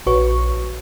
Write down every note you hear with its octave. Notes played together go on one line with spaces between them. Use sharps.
A#1 F#4 B4 C#5 C#6